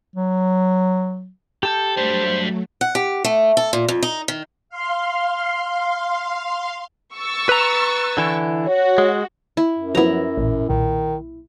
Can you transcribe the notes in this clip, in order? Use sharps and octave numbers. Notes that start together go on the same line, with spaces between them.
F#3
G4 A4 A5 G6
F#3 G3 A3 D4 C5
F#5
G4
A3
A4
A#2
F2
D#4
D#3
F5 C6
C#6 E6 A6
B4 A#5
D3 E3 E4
F#4 C#5
G#3
E4
F#2
F3 F#3 B3 E4 A#5
A1 A#2
B1 A#2 D#3